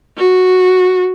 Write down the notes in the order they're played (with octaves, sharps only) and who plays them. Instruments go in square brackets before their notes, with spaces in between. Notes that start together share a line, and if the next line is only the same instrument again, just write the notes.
[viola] F#4